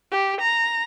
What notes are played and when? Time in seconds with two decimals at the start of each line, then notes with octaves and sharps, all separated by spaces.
0.12 G4
0.41 A#5